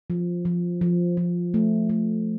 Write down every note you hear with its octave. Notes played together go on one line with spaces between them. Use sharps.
F3
F3
F3
F3
A3
A3